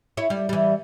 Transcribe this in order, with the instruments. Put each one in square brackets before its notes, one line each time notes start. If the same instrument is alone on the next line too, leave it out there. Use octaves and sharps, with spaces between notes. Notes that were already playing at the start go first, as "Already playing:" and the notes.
[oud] E4 C#5
G3
E3 G3